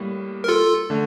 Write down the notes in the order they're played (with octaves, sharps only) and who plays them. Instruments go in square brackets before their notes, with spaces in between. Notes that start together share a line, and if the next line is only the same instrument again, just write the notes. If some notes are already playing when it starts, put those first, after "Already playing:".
Already playing: [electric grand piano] A2 G3 A#3
[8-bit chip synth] A#4
F4 A4
[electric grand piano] D3 A3